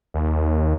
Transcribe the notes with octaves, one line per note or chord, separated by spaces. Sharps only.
D#2